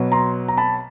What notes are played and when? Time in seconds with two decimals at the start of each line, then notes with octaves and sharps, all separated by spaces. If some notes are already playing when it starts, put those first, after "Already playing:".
Already playing: B2 F#3 B3
0.12 A#5 C6
0.49 A#5
0.57 A5 B5